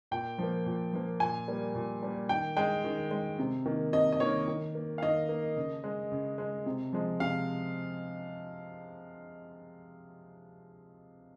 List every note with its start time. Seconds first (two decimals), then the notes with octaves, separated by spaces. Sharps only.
0.11 A#2 G5
0.38 F3 A#3
0.66 A#2
0.93 F3 A#3
1.20 A#2 G#5
1.48 G3 A#3
1.75 A#2
2.02 G3 A#3
2.29 D#3 G5
2.57 G#3 G5
2.84 D#3
3.11 G#3
3.39 C3
3.66 D#3 A#3
3.93 C3 D#5
4.12 D#5
4.20 D#3 A#3 C#5
4.48 D#3
4.75 A#3
4.98 F5
5.03 D#3 D#5
5.29 A#3
5.57 C#3
5.84 G#3
6.12 C#3
6.38 G#3
6.66 C3
6.93 F3 G#3
7.20 C3 F5